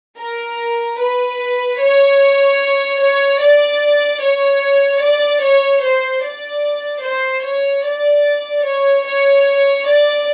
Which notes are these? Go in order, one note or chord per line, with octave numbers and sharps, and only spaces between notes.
A#4
B4
C#5
C#5
D5
C#5
D5
C#5
C5
D5
C5
C#5
D5
C#5
C#5
D5